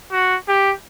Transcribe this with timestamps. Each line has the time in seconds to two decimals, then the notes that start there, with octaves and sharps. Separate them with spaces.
0.12 F#4
0.48 G4